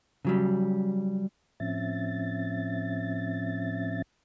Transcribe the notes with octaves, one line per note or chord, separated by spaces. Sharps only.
C#3 F#3 G3
A2 F3 C4 C#4 E5 A6